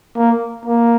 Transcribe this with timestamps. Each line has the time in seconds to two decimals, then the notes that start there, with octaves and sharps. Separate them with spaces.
0.16 A#3
0.65 A#3